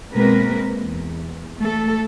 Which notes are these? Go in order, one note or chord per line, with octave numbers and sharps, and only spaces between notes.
B2 G#3 A#3 C4 A#4 B4
E2
A3 A4